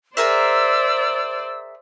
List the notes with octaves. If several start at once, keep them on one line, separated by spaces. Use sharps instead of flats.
G#4 A#4 C5 D5 E5 E6